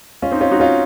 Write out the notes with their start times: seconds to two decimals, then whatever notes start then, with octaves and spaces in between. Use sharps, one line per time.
0.22 C#4 F4
0.31 C4 D#4
0.41 C#4 F4
0.51 D#4 F#4
0.60 C#4 F4